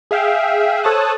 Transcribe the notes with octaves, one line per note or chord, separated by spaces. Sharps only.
G#4 E5 F5 G5
A4 C5 C#5 A5 D#6 F#6